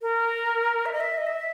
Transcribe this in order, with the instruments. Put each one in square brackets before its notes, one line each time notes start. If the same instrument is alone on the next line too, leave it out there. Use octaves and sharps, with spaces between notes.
[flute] A#4
E5
D#5
E5
D#5
E5